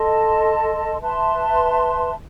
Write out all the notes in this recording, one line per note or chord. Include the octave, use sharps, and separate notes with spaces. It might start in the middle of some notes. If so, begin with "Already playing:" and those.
Already playing: A4 D#5 A5 C6
B4 E5 A5 C6